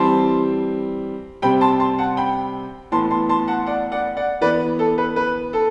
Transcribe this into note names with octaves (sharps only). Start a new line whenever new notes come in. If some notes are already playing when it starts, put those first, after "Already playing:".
Already playing: E3 G3 C4 A5 C6
C3 G3 C4 G5 B5
A5 C6
A5 C6
F#5 A5
G5 B5
A2 E3 B3 A5 C6
A5 C6
A5 C6
F#5 A5
D5 F#5
D5 F#5
D5 F#5
E3 B3 B4 D5
A4
B4
B4
A4